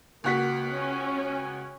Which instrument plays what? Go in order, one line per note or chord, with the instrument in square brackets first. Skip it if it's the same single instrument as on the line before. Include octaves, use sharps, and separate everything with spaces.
[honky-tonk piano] C#2 F#4 B6 [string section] A#3
[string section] C#4